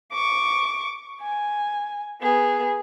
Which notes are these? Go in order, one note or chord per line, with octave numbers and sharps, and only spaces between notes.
C#6 D6
G#5
B3 G#4